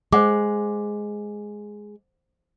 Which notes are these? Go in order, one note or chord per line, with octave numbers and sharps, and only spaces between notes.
G#3 C5 F#5 D6